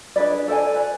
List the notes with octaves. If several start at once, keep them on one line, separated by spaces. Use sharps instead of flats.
D4 G#4 B4 D5
A4 C5 D5 G#5
B4 D5